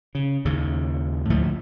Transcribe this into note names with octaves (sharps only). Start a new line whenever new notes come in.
C#3
D#2 G#2 C#3
D2 A2 F3 A3